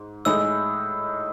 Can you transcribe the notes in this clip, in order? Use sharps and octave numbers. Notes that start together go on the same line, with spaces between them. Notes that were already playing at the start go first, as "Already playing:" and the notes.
Already playing: G#2
A2 G#3 D#4 G#4 E6